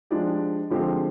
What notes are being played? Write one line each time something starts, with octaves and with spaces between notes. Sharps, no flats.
F3 G#3 D4 G4 D5
D3 F3 G#3 C4 G4